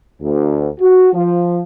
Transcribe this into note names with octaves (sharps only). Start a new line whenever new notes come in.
D2
F#4
F3